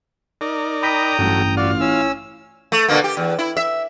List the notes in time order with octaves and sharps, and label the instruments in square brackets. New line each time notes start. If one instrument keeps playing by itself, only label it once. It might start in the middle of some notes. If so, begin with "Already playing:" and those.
[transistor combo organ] D#4 A#4 D5
[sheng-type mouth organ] G5 A#5 D#6 [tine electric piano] B5 A#6 B6
[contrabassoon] A1 [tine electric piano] G2 [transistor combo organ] F#3 A3
[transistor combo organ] F4 F5 [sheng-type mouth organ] F#4 D5
[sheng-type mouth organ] C#4 E6 [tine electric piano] E4
[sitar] A3
B2 D3 A#3
G4
E2
E4
E5